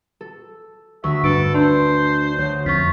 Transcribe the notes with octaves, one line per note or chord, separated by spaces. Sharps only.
A4
D2 E5 C#6
G2 A4 B4 D7
D4 C5 A5 C6
D2 C#5
F2 F4 C#6 B6